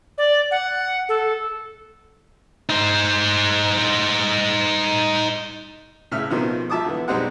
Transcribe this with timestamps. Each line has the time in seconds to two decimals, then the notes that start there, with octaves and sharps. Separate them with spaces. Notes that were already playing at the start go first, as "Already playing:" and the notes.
0.18 D5
0.51 F#5
1.09 A4
2.70 D#4 C5
6.11 A2 C#3 E5 F6
6.30 B2 D#3 F3 C4
6.70 F3 E5 A5 D6 D#6
6.85 D3 E3 B3
7.08 B1 G3 G#3 C4 D#4 F#5